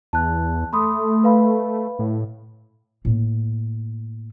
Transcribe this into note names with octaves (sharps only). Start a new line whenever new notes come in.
E2 A5 F#6
A3 B5 C6 D#6
B4 F5 B5
A2
A2 A#3